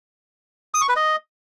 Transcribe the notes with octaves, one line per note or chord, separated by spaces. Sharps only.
D#6
C#6
B4
D#5